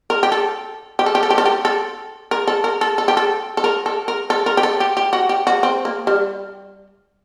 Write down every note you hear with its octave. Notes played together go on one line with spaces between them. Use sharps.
A#4
G4
A4
G4
A4
G4
A4
G4
A4
G4
A4
A#4
A4
A#4
A4
A4
G4
A4
A4
A#4
A4
A#4
A4
A#4
G4
A4
G4
G4
F#4
G4
F#4
C4
A#3
G3